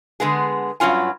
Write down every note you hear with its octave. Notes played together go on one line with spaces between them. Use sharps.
D3 G#3 B3 G#4
G2 F#3 C#4 F4 G#5